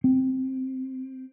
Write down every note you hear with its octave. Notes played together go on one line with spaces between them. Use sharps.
C4